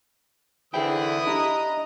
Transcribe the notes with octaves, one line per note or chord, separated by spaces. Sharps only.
D3 E3 E4 G#4 C5 G5 D#6 G6
D4 G4 D#5 A#5